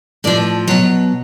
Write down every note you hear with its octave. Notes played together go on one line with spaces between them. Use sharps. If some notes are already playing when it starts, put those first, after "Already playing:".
A2 F3 D5
B2 F#3 C#5